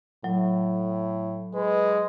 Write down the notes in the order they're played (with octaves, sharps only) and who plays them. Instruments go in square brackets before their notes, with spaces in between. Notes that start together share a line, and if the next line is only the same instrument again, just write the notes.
[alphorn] A2 [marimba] F#3
[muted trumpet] G#3 [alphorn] B4